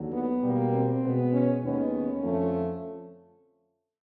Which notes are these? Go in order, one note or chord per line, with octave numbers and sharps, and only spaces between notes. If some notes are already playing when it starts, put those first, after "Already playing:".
Already playing: D#2 D3 F#3
B3
B2 G3 A#3
C4
B2 G#3 B3
C#4
D#2 D#3 G#3 B3 C#4
C#4
F2 D3 F3 A3